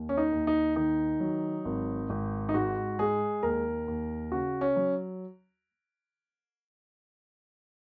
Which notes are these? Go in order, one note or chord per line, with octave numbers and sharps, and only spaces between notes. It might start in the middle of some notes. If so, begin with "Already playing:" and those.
Already playing: D#2
C#4
D#4
D#2
D#4
D#3 D#4
F#3
G#1
G#1
D#4
G#2 F#4
G#3 G#4
D#2 A#4
D#2
C#3 F#4
C#4
F#3